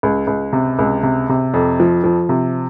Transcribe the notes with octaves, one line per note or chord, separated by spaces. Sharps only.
C#2
C#2
C3
C#2
C3
C3
F2
F3
F3
C3